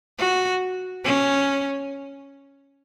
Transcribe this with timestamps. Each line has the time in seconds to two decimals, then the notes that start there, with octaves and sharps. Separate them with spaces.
0.19 F#4
1.04 C#4